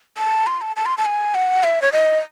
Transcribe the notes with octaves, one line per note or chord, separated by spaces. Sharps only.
A5
C6
A5
A5
C6
A5
G#5
F#5
E5
C#5
D#5